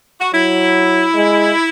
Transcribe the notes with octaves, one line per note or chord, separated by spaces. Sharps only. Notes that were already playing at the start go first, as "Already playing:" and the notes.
F#4
F#3 E4
G#3